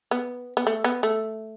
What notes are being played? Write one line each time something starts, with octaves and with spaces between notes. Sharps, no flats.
B3
B3
A3
B3
A3